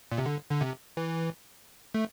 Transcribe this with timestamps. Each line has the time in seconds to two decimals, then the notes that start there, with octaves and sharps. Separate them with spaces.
0.11 A#2
0.18 C3
0.26 D3
0.51 D3
0.61 C3
0.97 E3
1.94 A3